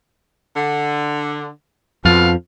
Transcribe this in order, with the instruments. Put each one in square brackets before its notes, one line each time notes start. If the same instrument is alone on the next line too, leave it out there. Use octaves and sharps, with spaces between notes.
[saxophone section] D3
[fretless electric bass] F2 F3 [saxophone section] B2 F4 F5